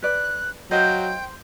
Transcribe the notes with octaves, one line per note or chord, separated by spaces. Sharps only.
B4 D5 F#6
F#3 C5 D#5 F5 G5